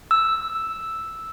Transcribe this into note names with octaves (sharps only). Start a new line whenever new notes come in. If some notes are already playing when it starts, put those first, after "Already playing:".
E6